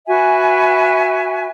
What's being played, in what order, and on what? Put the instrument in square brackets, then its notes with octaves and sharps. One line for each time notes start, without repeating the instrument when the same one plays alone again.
[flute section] F#4 B4 E5 G#5